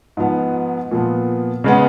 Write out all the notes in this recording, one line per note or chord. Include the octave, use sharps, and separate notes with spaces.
G#2 F3 B3
A#2 F3 B3
C#3 G#3 B3